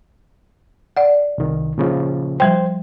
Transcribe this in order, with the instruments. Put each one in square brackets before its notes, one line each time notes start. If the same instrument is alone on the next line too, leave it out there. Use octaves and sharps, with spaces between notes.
[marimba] D5 F#5
[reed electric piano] C2 D#3
A#2 C#3 F3
[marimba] F3 G3 G5 [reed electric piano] C5